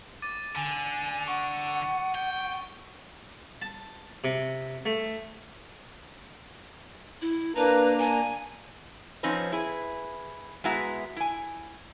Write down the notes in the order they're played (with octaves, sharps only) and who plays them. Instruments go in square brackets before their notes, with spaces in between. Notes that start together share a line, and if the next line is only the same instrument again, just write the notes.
[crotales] D6 A6 D#7
[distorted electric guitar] D3 [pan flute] G#5
[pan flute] F#5 [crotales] C#6
[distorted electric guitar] G5
[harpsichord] A5
C3
A3
[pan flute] E4
[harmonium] A#3 D4 A#5 [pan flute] B4
[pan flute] G#5
[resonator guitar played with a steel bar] F3 C4 C#4 D#4 B4
E4 G#4 B4
G#3 B3 E4 F#4 E5 A#5
E4 G#5